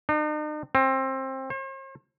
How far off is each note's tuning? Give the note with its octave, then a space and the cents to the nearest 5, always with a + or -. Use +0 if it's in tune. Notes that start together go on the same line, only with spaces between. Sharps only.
D#4 -45
C4 +25
C5 +45